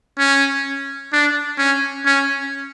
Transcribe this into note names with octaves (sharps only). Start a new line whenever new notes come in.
C#4
D4
C#4
C#4